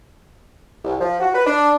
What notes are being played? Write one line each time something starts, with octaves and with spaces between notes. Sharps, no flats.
C2
F3
F#4
B4
D4